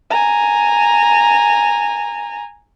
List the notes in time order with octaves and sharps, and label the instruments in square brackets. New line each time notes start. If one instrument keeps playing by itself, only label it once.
[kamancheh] G#5 A#5